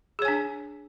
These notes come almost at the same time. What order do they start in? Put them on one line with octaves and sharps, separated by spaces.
G#4 C#5 G#5 D4